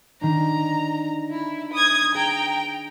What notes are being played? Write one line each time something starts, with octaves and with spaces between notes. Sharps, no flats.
D#3 D4 A#5
E4
D#6 G#6
G#4 G5 A#5